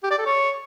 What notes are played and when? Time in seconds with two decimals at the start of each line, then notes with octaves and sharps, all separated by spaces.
0.03 G4
0.11 D5
0.18 A4
0.26 C#5